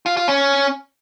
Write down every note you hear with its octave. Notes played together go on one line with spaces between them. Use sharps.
F4
F4
C#4